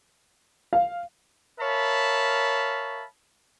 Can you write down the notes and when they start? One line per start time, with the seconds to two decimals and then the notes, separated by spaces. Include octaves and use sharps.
0.73 F5
1.59 A#4 C#5 E5 F5 A5 B5